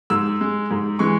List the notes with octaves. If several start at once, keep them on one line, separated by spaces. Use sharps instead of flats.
G#2 E6
G#3
G#2
E3 G#3 C#6